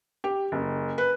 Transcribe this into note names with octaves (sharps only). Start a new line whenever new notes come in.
G4
F#1
B4